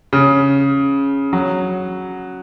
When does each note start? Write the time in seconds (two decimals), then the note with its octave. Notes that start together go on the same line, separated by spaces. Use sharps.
0.13 C#3
1.33 F#3